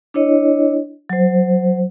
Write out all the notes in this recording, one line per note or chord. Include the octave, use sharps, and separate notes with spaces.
D4 E4 C#5 D#5
F#3 C5